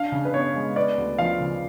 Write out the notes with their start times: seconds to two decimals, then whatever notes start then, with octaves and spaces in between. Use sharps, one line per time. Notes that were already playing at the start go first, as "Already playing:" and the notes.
Already playing: D4 F5
0.12 C#3
0.25 B4
0.34 B3 C#5
0.55 G#3
0.76 B3 D5
0.97 D2
1.18 F3 F5
1.40 C#3